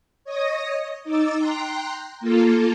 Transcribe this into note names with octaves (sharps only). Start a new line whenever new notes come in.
C#5 D#5 D#6 A#6
D#4 D6 E6 A6
G5 A#5 C6 F#6
A#3 F4 A4